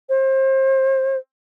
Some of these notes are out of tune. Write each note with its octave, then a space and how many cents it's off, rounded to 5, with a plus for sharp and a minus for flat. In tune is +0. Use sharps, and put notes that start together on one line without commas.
C5 +30